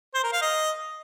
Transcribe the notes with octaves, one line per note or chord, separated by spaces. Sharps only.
C5
A#4
F5
D#5